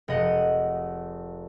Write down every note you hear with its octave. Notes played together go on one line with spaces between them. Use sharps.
F1 G#3 D#5 F#5